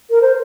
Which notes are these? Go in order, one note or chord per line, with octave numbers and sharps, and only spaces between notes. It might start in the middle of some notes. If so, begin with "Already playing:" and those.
A#4
C5